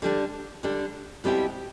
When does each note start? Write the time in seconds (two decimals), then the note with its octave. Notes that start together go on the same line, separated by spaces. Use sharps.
0.02 D3 G3 D4
0.63 D3 G3 D4
1.24 B2 G3 C4 E4 G4